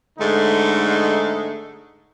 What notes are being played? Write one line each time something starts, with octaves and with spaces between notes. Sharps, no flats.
G#2 D3 G#3 A3 D#4